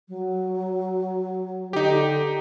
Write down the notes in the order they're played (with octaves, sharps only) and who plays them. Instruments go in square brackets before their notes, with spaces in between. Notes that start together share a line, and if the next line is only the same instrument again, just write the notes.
[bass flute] F#3
[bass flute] D3 [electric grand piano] D#4 G4